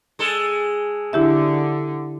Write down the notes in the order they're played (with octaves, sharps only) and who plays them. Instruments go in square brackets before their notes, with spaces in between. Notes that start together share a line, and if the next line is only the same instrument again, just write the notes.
[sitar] G#3 A4
[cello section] D3 [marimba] E4 G4 E5